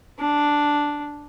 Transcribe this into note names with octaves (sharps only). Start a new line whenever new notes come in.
D4